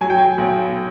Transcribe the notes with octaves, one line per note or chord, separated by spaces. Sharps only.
F#3 G#5
G5
G#5
B1